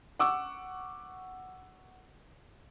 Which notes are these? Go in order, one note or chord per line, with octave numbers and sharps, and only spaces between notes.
F#5 C#6 D6 E6